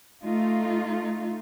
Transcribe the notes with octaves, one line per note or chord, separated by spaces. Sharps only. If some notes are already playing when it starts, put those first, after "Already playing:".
A3 D#4 F4